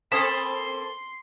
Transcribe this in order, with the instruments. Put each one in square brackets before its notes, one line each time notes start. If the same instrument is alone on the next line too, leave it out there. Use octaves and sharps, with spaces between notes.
[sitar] A#3 C4 A4 [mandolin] A5 B5 D#6 [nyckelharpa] C6